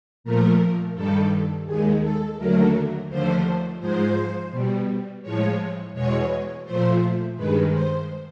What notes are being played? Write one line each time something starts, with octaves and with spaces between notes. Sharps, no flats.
A#2 F3 A3 A#4
G2 D#3 G3 A4
D#2 D#3 G#3 G#4
A4
D#2 D3 F#3 A3 A#4
D#2 D3 F3 A3 C5
G#2 F3 G#3 C5
B2 G3
A2 F3 G#3 C#5
E2 B2 G#3 C#5
A#2 F3 A3 C5
G2 D#3 G#3 B4
C5